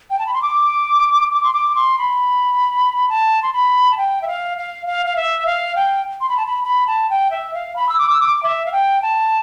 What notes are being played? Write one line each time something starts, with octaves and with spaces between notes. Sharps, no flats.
G5
A5
B5
C6
D6
D6
C6
D6
C6
B5
A5
C6
B5
A5
G5
E5
F5
F5
F5
F5
E5
F5
G5
C6
B5
A5
B5
B5
A5
G5
E5
F5
B5
E6
D6
E6
D6
E5
F5
G5
A5